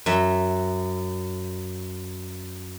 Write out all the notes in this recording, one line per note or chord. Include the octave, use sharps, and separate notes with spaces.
F#2 E5